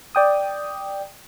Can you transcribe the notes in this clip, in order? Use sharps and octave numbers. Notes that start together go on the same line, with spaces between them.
D5 G5 D#6